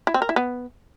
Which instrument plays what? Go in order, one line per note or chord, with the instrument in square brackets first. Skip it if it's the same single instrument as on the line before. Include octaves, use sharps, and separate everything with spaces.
[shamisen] E4
C4
A#4
E4
B3